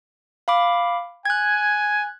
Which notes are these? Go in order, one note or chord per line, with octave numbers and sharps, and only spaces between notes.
F5 B5 D6
G#5 F#6 G#6